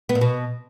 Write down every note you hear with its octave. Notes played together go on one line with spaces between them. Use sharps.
B3
A#2
B2